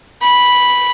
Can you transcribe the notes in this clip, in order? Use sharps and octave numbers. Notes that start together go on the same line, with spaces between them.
B5